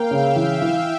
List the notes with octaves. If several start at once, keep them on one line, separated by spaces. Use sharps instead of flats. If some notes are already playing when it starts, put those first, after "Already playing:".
Already playing: A#3 F5 G5
C#3 E5
E3
E3